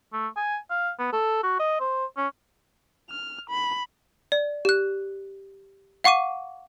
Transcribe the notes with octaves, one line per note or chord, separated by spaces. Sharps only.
A3
G#5
F5
B3
A4
F#4
D#5
C5
C#4
F6
B5
D5
G4 F#6
F5 F#5 C#6 D6 D#7